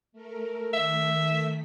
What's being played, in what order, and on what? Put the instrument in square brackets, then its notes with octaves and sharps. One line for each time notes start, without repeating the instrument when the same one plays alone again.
[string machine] A3 A#4
[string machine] D#3 A3 B6 [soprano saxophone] E5